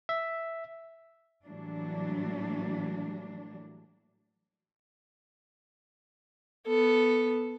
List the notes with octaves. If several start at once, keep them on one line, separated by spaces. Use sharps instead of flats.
E5
A2 E3 F#3 G3 A#3 D4
B3 A4